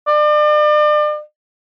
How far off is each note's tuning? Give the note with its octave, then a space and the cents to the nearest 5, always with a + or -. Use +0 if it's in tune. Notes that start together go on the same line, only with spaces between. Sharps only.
D5 +40